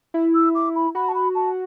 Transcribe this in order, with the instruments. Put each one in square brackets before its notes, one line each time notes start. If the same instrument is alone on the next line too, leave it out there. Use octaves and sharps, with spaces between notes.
[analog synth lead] E4
[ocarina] E6
D6
B5
[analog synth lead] F#4 [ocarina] B5
[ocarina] A5
B5
A5